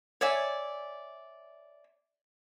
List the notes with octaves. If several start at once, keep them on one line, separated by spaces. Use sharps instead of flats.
C#5 D5 E5 G#5